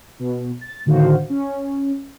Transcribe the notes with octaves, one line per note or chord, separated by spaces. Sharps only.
B2
A6
A2 D3 D#3 F#4 C5 F5
C#4